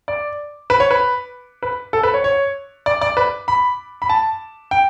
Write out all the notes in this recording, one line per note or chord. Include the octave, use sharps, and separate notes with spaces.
D5
B4
C#5
B4
B4
A4
B4
C#5
C#5
D5
D5
B4
B5
B5
A5
G5